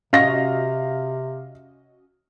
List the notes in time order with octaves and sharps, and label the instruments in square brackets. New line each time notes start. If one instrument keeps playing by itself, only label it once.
[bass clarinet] C3 [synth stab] C#4 F#4 D#5 [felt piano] F5 A#6